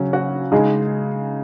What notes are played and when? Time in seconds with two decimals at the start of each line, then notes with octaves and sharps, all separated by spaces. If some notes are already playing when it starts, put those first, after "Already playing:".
Already playing: C#3 F#3 C#4
0.13 F#4 F#5
0.52 C#3 G#3 D#4 G#4